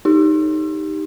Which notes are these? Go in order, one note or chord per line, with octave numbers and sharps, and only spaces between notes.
D#4 G4